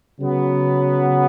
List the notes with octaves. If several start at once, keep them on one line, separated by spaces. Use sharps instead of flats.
C#3 F#3 B3